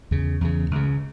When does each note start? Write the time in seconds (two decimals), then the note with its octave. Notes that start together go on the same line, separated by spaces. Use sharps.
0.11 E2 C#3
0.41 E2 C#3
0.71 C#2 C#3